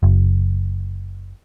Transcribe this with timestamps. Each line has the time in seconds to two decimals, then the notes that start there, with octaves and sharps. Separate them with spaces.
0.03 F#1